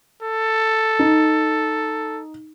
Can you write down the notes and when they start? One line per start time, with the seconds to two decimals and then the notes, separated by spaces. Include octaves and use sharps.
0.23 A4
0.99 D#4